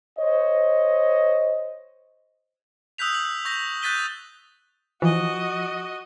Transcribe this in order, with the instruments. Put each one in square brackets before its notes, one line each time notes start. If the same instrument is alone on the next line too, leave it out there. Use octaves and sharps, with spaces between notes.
[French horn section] C5 C#5 D#5
[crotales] D#6 E6 F#6 G6 B6 F7
F#7
C#6 G6 A#6
F#6 G6 A6 B6 D#7 G7
[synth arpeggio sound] E3 [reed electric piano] F3 [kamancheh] F#4 D#5